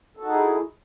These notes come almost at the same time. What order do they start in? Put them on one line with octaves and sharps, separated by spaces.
A4 F#4 D#4 G#4 E4